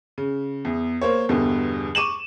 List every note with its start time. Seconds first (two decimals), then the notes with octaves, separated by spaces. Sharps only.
0.18 C#3
0.65 E2
1.01 A#3 C5 C#5
1.29 E2 G2 B2 D3
1.95 C#6 D6 D#7 E7 F#7